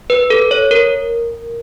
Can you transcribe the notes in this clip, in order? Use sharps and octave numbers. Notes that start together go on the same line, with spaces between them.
B4
A4
C#5
A#4